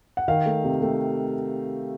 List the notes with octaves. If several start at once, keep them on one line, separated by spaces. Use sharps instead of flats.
F#5
D#3 F5
A3
C3
A3